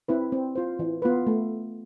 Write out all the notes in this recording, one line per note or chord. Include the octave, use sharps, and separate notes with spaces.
C4 E4 B4
C4
F4 C5
E3
B3 F4 B4
A3